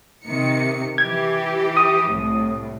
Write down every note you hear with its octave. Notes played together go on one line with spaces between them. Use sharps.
C3 D#3 C#7
E3 G4 G#6
D#6
C2 A2